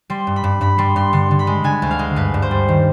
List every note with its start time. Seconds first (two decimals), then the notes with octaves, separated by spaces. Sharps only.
0.10 G3 C6
0.27 G2
0.36 B5
0.44 G2
0.61 G2 B5
0.78 G3 C6
0.96 G2 C6
1.13 D3 C6
1.31 D3
1.39 B5
1.47 G#3
1.64 D3 G#5
1.82 D2
1.91 F5
1.99 G#3
2.16 G2 B4
2.34 G2
2.42 C5
2.51 G3
2.69 D#3